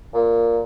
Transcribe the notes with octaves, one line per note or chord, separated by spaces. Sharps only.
A#2